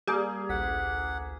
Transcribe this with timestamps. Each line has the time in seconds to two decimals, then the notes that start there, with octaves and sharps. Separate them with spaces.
0.07 G3 A#3 G#4
0.49 A1 D2 F#5 B6